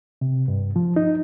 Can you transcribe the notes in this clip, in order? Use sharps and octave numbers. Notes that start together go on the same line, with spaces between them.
C3
G2
F3
D#4